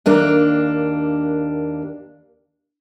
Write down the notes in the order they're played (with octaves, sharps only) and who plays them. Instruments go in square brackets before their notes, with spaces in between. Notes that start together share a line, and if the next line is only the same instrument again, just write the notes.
[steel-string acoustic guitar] D#2 A#3 D4